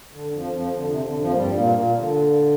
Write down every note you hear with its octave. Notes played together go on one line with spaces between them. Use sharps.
D3
F2 F3
F2 F3
D3
C3
D3
F2 F3
A#3
G2 G3
A#2 A#3
A#2 A#3
D3